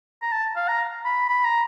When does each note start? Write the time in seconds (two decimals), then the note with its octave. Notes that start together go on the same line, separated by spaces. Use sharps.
0.22 A#5
0.32 A5
0.56 F5
0.68 A#5
1.05 B5
1.29 B5
1.45 A#5